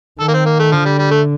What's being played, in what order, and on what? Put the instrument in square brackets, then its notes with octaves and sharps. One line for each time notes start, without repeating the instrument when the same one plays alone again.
[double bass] D#3 [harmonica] A4
[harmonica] A#3
C4
A#3
A3
[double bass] D3 [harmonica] F3
[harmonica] G3
G3
A3